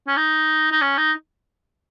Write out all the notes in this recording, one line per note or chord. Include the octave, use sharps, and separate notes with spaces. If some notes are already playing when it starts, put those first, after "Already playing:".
C#4
D#4
D#4
C#4
D#4